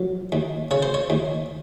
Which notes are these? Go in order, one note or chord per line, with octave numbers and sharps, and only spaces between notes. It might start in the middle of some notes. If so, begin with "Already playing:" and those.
Already playing: F#3
D#2
C#3 C#5
C5
C#5
D#2